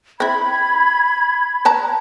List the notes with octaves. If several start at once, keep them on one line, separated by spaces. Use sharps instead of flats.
C4 E4 B5 G#6
B4 A5 A#5